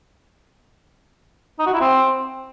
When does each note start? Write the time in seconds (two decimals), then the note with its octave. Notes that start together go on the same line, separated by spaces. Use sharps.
1.59 D#4
1.66 F#4
1.74 E4
1.81 C4